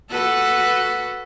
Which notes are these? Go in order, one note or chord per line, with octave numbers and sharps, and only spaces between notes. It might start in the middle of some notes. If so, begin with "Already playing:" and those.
F#4 A4 B4